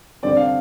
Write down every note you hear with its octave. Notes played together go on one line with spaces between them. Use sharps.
G2 D3 G3 C4 D5
F5